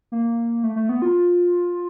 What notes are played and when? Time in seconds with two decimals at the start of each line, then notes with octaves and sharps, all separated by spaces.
0.12 A#3
0.64 A3
0.76 A3
0.89 B3
1.02 F4